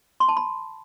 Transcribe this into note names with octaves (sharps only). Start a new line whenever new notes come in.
C6
A5
B5